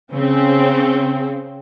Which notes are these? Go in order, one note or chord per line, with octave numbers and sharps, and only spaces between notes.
C#3 C4